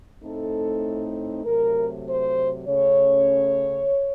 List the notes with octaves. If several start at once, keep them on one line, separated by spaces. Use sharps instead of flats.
A2 A3 C4 D#4 A4
C3 F#3 A3 A#4
C5
C#3 A3 C#4 C#5